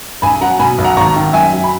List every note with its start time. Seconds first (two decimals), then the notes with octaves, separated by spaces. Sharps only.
0.22 B1 G#5 B5
0.41 F#3 F#5 A#5
0.59 B2 G#5 B5
0.78 B1
0.84 F#5 A#5
0.97 G#1 A#5 C#6
1.16 D#3
1.33 F#2 E5 G#5
1.53 F#3
1.64 B5